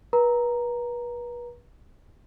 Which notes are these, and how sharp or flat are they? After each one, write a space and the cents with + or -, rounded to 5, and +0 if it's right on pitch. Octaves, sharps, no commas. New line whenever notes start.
B4 -35 A#5 +0